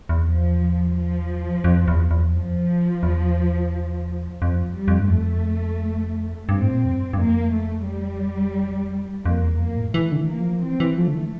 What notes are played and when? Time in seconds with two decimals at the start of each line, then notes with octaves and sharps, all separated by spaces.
0.09 E2
0.26 F3
0.95 F3
1.64 F2
1.88 E2
2.11 E2
2.34 F2 F3
3.03 E2
4.42 F2 F3
4.75 G3
4.88 F2
4.99 G2
5.10 F2 A3
6.49 G2 C4
6.61 A2
6.72 A#2
6.85 F2
6.95 G2
7.13 G2
7.18 F2 A#3
7.52 A3
7.87 G3
9.25 F2 A#3
9.42 E2
9.60 F2 A#3
9.77 A2
9.94 E3 A3
10.12 D3
10.17 E3
10.29 A#3
10.40 F3
10.63 E3 C4
10.80 E3
10.98 F3 A3
11.08 D3
11.15 E3